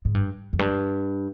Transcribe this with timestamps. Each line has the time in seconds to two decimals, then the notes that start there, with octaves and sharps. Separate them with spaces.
0.05 G#2
0.15 G2
0.53 F2
0.59 G2